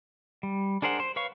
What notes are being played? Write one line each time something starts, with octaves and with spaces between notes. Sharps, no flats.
G3
D4 G#4 A#4 C5 F#5
C5
B4 C#5 F5 C#6